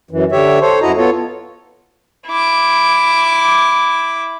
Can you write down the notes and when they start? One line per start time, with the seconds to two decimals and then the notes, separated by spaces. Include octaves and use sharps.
0.11 F#2 E3
0.32 D3 G4 C#5 E5
0.61 A4 C5 C#5
0.82 F#2 E4 F#4 D#5 A#5
0.97 B3 F4 A4 C#5
2.28 E4 D6